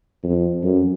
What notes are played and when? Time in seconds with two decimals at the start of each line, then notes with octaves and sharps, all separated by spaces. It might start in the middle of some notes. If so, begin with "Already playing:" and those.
0.24 F2
0.63 F#2